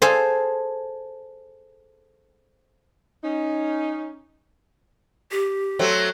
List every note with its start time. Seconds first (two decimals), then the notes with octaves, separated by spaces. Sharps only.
0.02 G#4 A4 C5 F5 G#5
3.24 C#4 D#4
5.32 G4
5.79 F#3 A3 C4